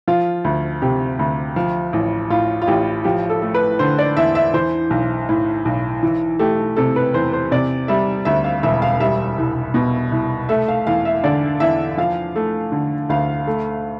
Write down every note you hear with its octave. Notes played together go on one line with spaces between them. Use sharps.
F3 F4
D2
C3 G4
D2
F3
A1
A2 F4
F4
A1 G4
F3 G4
A4
A3
B4
D3 C5
D5
E2 E5
E5
E3 C5
B1
A2
B1
E3
A3 G4
C3 A4
B4
E2 C5
C5
C3 D5
G3 E5
D2 E5
F5
E1 E5
F5
G3 E5
C2
B2
C2
A3 E5
F5
E2 F5
E5
D3 D5
E2 E5
F3 F5
A3
D3
D2 F5
A3